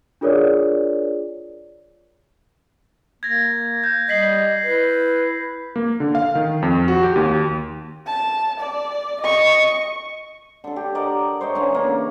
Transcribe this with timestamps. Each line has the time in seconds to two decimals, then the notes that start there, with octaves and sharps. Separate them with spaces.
0.21 D4 F4 G#4 A#4 C#5 D5
3.23 A#3 G#6 A#6
3.84 G6
4.09 G3 D#5 B6 C7 F#7
4.64 E4 B4
5.76 A#3
6.00 D3
6.15 F5
6.35 D#3
6.62 F2
6.88 F#4
7.03 G4
7.16 D#2
8.07 A5
8.60 D5
9.21 D#5 C#6
10.64 D3 A4
10.76 G4
10.95 A#4 D5 D#5 F#5
11.41 C5 C#5 D#5 E5
11.55 D3 E3 C#4
11.74 C#3 A#3